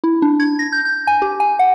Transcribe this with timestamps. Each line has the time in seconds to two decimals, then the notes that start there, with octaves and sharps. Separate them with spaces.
0.04 E4
0.22 D4
0.40 G#6
0.59 A#6
0.72 G6
0.85 G6
1.07 G#5
1.22 G4
1.40 G#5
1.59 F#5